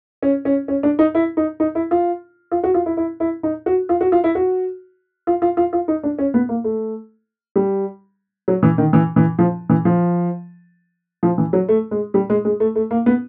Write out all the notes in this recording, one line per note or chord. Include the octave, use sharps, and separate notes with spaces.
C#4
C#4
C#4
D4
D#4
E4
D#4
D#4
E4
F4
F4
F#4
F4
E4
E4
E4
D#4
F#4
F4
F#4
F4
E4
F#4
F4
F4
F4
F4
D#4
D4
C#4
B3
A#3
A3
G3
F#3
E3
D#3
E3
E3
F3
E3
F3
F3
E3
F#3
A3
G#3
G3
G#3
G#3
A3
A3
A#3
B3